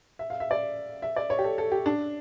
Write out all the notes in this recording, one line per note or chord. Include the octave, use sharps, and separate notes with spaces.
E5
F5
E5
D5
E5
D5
C#5
G4
A4
A4
G4
D4